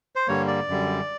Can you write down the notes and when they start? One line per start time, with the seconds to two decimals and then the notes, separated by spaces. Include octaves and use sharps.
0.16 C5
0.28 G2 D3 G3 A#3 C#5
0.48 D5
0.68 F#2 D3 G3